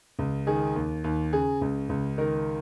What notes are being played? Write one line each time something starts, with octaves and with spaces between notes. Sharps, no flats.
C#2
D#3 G#4
D#2
D#2
C#3 G#4
C#2
C#2
D#3 A#4